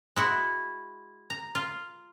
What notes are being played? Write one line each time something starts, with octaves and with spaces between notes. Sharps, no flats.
G#3 E4 F#4
A#5
F4